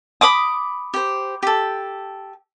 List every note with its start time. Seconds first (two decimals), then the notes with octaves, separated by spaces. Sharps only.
0.21 B5 D6 D#6
0.94 G4 C5
1.43 G4 A4